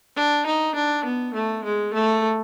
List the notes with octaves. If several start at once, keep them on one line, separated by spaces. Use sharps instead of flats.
D4
D#4
D4
B3
A3
G#3
A3